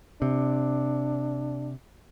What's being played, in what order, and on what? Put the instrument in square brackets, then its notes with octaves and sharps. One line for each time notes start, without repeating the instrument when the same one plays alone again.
[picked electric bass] C3 [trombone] D4